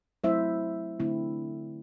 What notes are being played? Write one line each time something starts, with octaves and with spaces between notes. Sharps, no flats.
F#3 A3 C4 E4 C5 E5
D3 A3 C4 E4